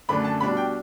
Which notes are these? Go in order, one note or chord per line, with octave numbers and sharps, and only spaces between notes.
F#2 D3 A3 D4 B5
A5
B2 G3 D4 B5
G5